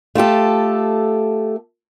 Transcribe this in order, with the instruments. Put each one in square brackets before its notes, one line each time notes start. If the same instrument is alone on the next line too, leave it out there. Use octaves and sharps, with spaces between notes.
[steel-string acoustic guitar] A3 F4 G4 A4